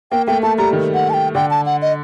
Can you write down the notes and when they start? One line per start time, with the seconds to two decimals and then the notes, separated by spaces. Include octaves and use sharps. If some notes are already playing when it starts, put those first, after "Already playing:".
0.12 A#3 G5
0.27 A3 G5
0.42 A3 A5
0.58 G3 A#5
0.73 D#3
0.94 F#5
1.10 A5
1.14 G5
1.35 D3 G5
1.51 A5
1.66 F#5
1.82 D#5